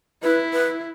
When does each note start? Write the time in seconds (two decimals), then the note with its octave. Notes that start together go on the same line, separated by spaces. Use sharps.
0.23 E4 B4
0.53 B4